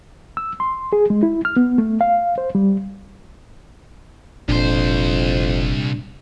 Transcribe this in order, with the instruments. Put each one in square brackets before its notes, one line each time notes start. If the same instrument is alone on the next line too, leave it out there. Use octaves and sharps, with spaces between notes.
[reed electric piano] E6
C6
G#4
G#3
E4
F6
B3
A3
F5
C5
G3
[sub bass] F#1 [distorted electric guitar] C2 C5 [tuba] F2 [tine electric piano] A#2 D4